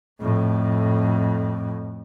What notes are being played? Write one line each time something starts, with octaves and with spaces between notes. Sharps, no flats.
F2 A2